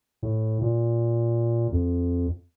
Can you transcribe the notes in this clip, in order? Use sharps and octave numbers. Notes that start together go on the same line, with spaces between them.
A2
A#2
F2